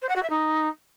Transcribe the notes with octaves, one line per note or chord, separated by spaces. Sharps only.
C5
F#5
F#4
E5
D#4